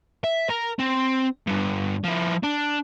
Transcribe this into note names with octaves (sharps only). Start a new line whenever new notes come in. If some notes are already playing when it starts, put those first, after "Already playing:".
E5
A#4
C4
G2 D3
F3 E4
D4